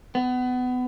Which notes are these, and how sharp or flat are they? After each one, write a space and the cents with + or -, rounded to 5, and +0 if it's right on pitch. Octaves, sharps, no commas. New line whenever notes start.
B3 +25